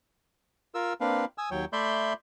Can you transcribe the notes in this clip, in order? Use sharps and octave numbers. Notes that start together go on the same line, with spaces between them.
F4 A#4 E6
A#3 C4 D4 B4 F5
G#5 D#6 E6
D#2 F#3 C#5 G5
A3 D5 E5 B5 C6 G6